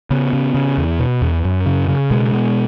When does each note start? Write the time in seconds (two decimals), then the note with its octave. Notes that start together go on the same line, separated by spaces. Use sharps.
0.11 C#3 B3
0.33 C#3
0.54 C#3
0.78 E2
0.99 B2
1.22 E2
1.45 F#2
1.66 C#3
1.88 C#3
2.11 B2 G#3
2.33 B2